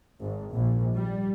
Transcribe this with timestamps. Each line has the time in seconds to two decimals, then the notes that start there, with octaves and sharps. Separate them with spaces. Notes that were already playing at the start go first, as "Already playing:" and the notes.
0.21 G#1
0.54 A#1
0.96 G3